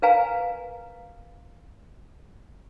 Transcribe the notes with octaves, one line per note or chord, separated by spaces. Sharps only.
A#4 B4 F5 G#5 A#5